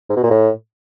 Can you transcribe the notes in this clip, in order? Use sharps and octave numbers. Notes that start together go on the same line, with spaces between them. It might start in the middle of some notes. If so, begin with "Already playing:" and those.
G#2
B2
A#2
A2